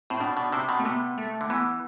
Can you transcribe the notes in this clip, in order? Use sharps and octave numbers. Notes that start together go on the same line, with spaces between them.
A2 C4
B2 D4
B2
C3 C4
B2
A3
C3 B3
A3
D3
E3 B3